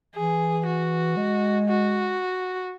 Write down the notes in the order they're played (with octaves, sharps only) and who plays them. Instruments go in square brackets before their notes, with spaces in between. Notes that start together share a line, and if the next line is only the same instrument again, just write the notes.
[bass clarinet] E3 [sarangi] G#4
[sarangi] F#4
[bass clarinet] G#3
[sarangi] F#4